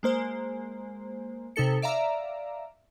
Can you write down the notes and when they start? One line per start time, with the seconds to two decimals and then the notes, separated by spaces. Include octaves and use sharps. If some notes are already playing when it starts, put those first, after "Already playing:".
0.03 G#3 A#3 C5
1.56 C3 D#4 A4 C#7
1.82 D5 E5 F5 A#5